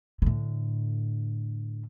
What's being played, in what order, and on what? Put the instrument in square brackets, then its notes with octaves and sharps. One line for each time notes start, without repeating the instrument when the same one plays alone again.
[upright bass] A2 D3